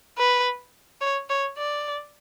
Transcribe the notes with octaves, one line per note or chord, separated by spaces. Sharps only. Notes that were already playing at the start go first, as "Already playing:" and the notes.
B4
C#5
C#5
D5